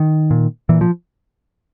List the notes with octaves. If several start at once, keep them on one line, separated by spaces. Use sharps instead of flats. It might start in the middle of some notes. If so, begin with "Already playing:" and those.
Already playing: D#3
A#2
A#2 E3
F3